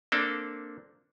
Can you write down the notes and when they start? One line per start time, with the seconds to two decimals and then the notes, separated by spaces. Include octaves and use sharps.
0.12 A#3 C4 D4 A4